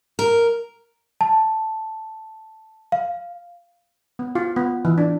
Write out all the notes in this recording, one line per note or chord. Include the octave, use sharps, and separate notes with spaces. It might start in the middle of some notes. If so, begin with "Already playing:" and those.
A#4
A5
F5
B3
F4
B3
E3
D4